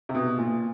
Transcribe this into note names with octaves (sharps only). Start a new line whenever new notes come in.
C3
B2
A#2